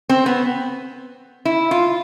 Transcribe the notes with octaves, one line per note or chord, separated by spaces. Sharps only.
C4
B3
E4
F4